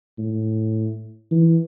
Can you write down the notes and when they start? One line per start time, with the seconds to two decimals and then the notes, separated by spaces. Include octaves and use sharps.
0.18 A2
1.31 E3